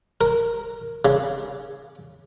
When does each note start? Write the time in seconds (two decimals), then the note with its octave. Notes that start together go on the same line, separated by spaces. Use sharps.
0.21 A#4
1.05 C#3